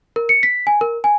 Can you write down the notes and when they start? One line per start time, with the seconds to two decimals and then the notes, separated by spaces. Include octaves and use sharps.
0.16 A#4
0.29 C#7
0.43 B6
0.67 G#5
0.81 A#4
1.04 G#5